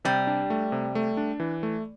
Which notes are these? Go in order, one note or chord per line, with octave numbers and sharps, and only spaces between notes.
C3 G3
D4
A3
C3
A3
D4
E3
A3